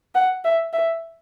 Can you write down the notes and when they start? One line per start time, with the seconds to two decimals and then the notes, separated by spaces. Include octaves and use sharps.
0.15 F#5
0.45 E5
0.73 E5